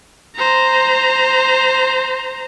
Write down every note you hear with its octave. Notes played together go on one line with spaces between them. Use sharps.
C5 A#5